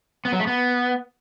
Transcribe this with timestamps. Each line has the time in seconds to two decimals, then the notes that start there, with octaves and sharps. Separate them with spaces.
0.25 B3
0.32 F#3
0.40 A3
0.47 B3